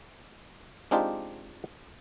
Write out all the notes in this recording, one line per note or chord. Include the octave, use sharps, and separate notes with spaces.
G#3 C4 D4 D#4 F4 G4